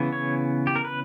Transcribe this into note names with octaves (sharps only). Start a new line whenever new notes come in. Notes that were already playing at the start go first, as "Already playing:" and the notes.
Already playing: C#3 E3 B3
C#5
G4
A#4
B4